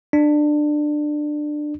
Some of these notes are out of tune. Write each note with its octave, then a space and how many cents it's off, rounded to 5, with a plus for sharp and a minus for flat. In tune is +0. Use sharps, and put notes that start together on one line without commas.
D4 +20